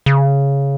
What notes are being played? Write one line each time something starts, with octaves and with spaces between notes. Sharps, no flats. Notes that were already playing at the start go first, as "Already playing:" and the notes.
C#3